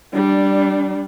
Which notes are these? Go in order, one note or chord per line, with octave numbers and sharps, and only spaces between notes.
G3 D4